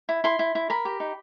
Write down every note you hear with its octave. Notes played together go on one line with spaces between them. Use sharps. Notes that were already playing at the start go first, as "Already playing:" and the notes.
E4
E4 C6
E4
E4
A#4 B5
G4
D#4